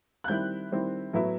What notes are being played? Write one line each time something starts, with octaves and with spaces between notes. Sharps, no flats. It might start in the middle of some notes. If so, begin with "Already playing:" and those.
F#6
D#3 G3 C4 E4 G6
D#3 G3 C4 E4
A2 F#3 B3 E4